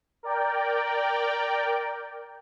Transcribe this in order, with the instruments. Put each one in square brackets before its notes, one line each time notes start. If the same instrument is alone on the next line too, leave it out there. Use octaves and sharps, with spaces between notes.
[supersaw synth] A#4 D5 G5